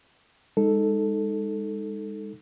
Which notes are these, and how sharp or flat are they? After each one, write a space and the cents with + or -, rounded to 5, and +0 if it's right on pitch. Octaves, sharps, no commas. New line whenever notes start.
G#3 -30 D#4 +0 A4 +0